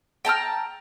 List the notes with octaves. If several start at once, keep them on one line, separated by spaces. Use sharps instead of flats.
G5 A5 A#5 F6